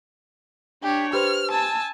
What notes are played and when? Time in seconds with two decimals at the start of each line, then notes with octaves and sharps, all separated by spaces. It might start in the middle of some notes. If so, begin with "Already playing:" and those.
0.83 D4 G4 C#5
1.13 G4 B4 C5 F6
1.51 G#5 A5 E6